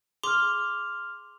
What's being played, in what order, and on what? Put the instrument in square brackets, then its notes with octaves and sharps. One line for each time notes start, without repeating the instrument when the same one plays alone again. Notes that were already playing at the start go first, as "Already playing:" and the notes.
[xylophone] G#4 C6 D6 [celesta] F6 F7